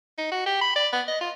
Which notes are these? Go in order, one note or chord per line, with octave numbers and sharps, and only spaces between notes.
D#4
F#4
G4
B5
D5
B3
D#5
F4